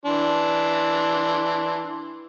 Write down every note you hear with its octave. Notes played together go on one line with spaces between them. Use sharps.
E3 D4 C6